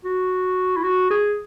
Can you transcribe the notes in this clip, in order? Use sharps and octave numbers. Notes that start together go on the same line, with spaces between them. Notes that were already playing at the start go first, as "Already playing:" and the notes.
F#4
E4
F#4
G#4